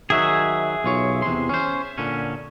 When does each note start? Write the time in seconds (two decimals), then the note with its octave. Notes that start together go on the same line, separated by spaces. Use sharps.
0.10 D#3 F#3 F#4 G#4 E5
0.84 B1 F4 C#5
1.22 E2 C3 C6
1.49 C#4 C5
1.98 A#2 D3 C#4